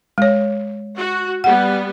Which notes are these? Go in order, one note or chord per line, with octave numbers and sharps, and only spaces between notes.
G#3 C#5
F#4
G3 B3 F#5